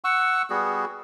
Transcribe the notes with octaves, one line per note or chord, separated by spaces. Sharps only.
F#5 C#6 E6
G3 B3 F#4 G#4